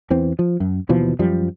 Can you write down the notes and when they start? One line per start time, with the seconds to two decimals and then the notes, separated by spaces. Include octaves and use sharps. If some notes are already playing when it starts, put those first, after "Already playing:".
0.10 E2 E3 C4
0.39 F3
0.60 F#2
0.89 D#2 B2 E3 F3
1.19 F#2 F3 G3